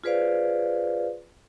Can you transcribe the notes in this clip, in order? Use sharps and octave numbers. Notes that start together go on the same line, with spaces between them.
F4 G#4 B4 C5 D5 F5